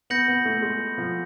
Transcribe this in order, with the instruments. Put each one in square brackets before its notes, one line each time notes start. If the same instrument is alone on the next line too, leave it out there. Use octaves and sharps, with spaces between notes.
[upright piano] B3 [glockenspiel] G6 A#6 C#7 F#7
[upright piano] B3
A3
G#3
F3